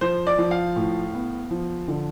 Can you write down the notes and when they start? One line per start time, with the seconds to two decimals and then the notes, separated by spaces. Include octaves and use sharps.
0.01 F3 C5
0.27 D5
0.38 F3
0.51 F5
0.76 A2
1.14 B3
1.51 F3
1.88 D3